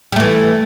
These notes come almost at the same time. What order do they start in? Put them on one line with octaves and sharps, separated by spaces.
G3 A3 E3